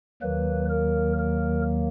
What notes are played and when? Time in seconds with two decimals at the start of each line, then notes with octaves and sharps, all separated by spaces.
0.22 D#2 D#3 F#3 A#3 B4
0.70 A#4
1.19 A#4